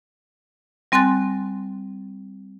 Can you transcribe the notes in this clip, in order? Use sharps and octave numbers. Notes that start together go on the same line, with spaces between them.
G3 C4 G#5 C6 F#6 A6